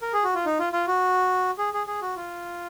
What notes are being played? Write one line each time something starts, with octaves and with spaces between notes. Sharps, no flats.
A#4
G#4
F#4
F4
D#4
F4
F4
F#4
G#4
G#4
G#4
F#4
F4